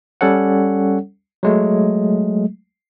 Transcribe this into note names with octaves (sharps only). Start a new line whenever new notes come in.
G3 C#4 A4 C#5 F#5
F#3 G#3 A3